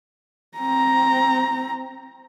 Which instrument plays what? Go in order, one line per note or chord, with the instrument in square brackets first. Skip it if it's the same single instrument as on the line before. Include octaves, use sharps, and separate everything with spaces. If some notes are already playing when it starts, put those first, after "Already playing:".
[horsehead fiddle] C4 A#5